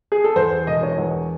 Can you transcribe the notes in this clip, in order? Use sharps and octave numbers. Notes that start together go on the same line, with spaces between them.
G#4
A4
E2 C5
E1 D#5
C#5
E2